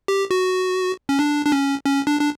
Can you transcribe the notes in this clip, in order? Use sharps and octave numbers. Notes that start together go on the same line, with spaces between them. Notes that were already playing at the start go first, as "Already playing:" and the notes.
G4
F#4
C#4
D4
D4
C#4
C#4
D4
D4